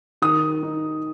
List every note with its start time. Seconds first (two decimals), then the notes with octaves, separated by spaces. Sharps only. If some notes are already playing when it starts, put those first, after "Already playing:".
0.22 D#3 D#6
0.63 D#4